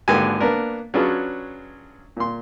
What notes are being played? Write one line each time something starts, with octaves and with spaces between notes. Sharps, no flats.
G#1 D3 A#3 G4 B4 G#5
A#3 B3 D4 A#4
F#3 C#4 D4 F4 G#4 B4
A#2 C6